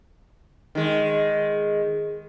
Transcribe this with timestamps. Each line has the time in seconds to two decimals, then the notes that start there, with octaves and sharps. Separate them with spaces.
0.75 D#3 G#3